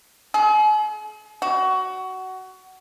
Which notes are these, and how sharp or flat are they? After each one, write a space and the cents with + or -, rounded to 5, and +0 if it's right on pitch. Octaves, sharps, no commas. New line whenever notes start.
G#4 +40
F#4 +20